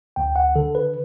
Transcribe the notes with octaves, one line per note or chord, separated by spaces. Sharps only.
D2 G5
F#5
D3 A4
B4